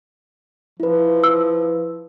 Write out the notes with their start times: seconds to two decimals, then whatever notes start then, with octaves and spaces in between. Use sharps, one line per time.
0.80 F3 E4 B4
1.24 E6